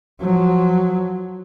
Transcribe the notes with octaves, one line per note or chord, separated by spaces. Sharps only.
F3 F#3